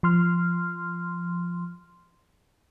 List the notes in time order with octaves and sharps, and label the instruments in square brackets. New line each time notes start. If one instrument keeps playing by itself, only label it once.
[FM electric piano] F3 C6 F6